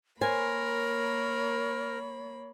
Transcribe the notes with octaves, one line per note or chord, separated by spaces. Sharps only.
A#3 A#4 C5 C#5 G#5 B5